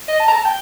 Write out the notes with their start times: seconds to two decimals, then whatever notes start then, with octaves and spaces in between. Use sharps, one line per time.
0.08 D#5
0.20 A5
0.28 A#5
0.32 A5
0.45 G5